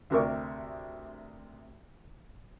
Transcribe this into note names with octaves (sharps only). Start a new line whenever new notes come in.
D2 C3 A#4 D5 C#6